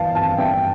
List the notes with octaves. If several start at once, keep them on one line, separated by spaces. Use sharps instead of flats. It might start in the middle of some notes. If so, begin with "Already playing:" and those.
Already playing: G1 E3 F5 A5
G2 F5 A5
G2 E5 G5